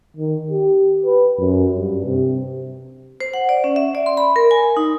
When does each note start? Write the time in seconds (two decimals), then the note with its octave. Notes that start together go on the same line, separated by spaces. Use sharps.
0.16 D#3
0.50 G4
1.05 B4
1.38 F#2
1.75 G2
2.05 C3
3.20 C5
3.34 F#5
3.49 D5
3.64 C#4
3.76 E5
3.95 D5
4.06 C6
4.17 B5
4.36 A#4
4.51 G#5
4.77 D#4